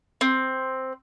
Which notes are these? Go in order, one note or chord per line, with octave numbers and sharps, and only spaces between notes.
C4